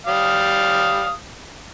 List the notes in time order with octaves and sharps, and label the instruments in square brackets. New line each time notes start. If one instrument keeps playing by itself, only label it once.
[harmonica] G3 F5 D#6